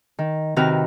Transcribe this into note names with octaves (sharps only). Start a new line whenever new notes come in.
D#3
C3 D#3 F#4 B4 F6